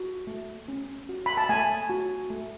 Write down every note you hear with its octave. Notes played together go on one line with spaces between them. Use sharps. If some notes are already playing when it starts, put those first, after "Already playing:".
Already playing: F#4
A3
C#4
F#4
B5
A5
A3 G#5
F#4
A3